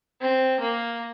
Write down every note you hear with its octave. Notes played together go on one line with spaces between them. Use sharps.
C4
A#3